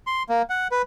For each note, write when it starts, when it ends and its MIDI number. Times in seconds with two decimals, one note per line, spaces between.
0.07 0.23 84
0.29 0.42 58
0.50 0.68 78
0.71 0.82 71